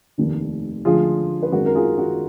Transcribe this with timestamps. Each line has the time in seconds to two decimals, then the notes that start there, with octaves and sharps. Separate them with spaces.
0.18 F1 D#2 D#3
0.85 D2 D3 F3 G#3 F4 G#4
1.43 B4
1.52 G#1 F#2 D#3 G#3 F#4 A#4
1.66 A#4
1.75 F4 G#4
1.98 F#4